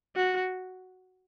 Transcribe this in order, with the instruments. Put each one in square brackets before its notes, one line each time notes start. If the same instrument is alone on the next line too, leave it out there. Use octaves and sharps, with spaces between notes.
[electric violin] F#4